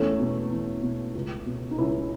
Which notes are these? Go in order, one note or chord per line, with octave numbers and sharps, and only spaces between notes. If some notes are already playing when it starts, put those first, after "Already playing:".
Already playing: E2 A3 C#4
B2
E2
B2
C#2
B2
D#4
C#2 C#4 E4